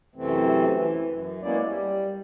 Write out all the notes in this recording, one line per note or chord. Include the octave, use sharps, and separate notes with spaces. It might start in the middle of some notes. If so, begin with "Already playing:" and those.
F#2 C3 E3 A3 C4
E3
F#2
G#3 A#3 B3 C#4 E4 D5
G3